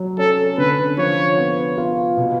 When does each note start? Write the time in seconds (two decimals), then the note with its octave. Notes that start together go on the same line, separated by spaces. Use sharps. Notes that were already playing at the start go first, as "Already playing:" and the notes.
Already playing: F#3
0.18 C#4 A4
0.58 D3 B4
0.98 F3 C#5
1.38 B3
1.78 F4
2.17 B2